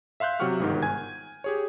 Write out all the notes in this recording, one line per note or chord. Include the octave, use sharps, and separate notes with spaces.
E5 F5 C6 F#6 G6
C3 F#3 G4 F#5 C#6 F6
G1 G#2 D#3
G#5 G#6
G4 G#4 C#5